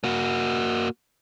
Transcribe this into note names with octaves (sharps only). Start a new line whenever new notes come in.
A#3 F#4